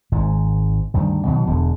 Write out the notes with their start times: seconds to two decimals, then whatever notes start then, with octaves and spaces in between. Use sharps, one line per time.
0.12 G#1 G#2
0.94 D2 G2 D#3
1.25 B2 D#3 F#3
1.46 E1 E2 D3